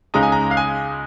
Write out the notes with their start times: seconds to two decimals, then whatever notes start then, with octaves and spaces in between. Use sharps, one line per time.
0.14 C#2 C#3 G#3 D#4 A#5
0.23 G#5
0.32 A#5
0.51 F5
0.57 G#5